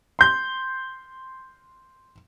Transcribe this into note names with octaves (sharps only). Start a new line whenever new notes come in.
C6 G6